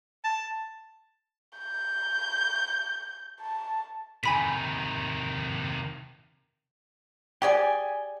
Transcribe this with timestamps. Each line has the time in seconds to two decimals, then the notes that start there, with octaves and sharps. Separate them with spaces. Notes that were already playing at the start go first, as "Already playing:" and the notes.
0.24 A5
1.59 G6
3.41 A5
4.24 C3 D#3 G#5 B5 B6
7.42 G4 G#4 D5 G5 G#5